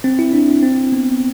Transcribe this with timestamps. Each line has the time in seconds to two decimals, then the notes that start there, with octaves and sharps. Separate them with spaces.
0.04 C4
0.19 E4
0.33 D4
0.63 C4
0.92 B3